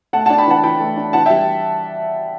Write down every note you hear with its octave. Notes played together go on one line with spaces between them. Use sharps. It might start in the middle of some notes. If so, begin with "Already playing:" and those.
A3 F#5 A5
D4 F#5 A5
G5 B5
E3 F#5 A5
E3 G5 B5
A3
D4
E3 F#5 A5
G3 E5 G5